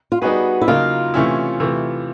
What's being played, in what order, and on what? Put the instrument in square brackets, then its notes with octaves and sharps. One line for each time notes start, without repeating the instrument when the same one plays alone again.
[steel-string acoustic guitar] F4
[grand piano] G3 B3 D#4 G#4 B4 [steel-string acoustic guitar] F#4
[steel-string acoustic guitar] E4
[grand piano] C#3 F#3 A#3 D#4 [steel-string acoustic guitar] F4
[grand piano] C3 E3 A3 C#4 E4
C3 E3 A3